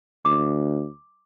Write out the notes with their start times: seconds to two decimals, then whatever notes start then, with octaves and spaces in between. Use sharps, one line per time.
0.25 D2 D6